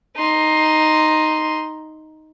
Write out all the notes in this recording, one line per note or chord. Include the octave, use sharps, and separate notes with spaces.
D#4 C6